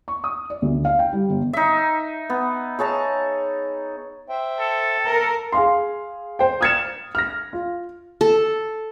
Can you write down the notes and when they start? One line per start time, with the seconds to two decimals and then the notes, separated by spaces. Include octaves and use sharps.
0.08 C#6
0.24 D#6
0.50 D5
0.62 D2
0.85 F5
0.99 G5
1.13 G3
1.29 G1
1.53 D#4 E5
2.30 B3
2.79 G#4 C#5 A5 A#5
4.29 C5 E5 G5
4.60 A4
5.06 A#4
5.52 G#4 F5 C6
6.39 C5 G5
6.61 D#6 F6 G#6 A6 C#7 E7
7.15 F6 A#6
7.53 F4
8.21 A4